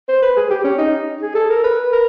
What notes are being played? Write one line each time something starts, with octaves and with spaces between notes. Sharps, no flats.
C5
B4
G#4
G4
C#4
D#4
G#4
A4
A#4
B4
A#4